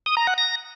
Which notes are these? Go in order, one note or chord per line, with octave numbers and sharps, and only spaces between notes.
D#6
A#5
F#5
A#6